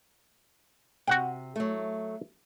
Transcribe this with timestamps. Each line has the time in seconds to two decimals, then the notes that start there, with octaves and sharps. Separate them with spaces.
1.07 C3 F#4 F#5 G5
1.56 F#3 A3